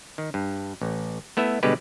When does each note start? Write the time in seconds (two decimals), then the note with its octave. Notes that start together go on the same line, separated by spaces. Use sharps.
0.18 D#3
0.34 G2
0.81 A1
1.37 A3 B3 E4 E5
1.63 B2 D3 G3 G#3 G4 B4